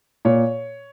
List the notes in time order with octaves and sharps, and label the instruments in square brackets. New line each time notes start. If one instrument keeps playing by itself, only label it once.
[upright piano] A#2 C#5